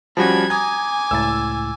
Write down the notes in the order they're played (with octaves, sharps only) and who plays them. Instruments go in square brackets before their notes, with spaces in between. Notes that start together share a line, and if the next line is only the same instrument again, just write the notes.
[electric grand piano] F3 G3 F#4 [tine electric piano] C#4 G#5 A5 [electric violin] B5 G#6
[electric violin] G#5 D6 [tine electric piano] A#5 D#6 [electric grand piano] G#6
[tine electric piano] C#2 A2 A6 [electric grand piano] E6